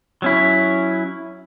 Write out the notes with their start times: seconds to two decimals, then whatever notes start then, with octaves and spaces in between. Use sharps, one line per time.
0.22 F#3 C#4 E4